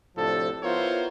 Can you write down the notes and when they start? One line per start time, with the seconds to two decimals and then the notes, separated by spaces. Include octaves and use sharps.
0.17 A2 C3 F3 D4 A4
0.63 B3 E4 F4 A#4 C5 C#5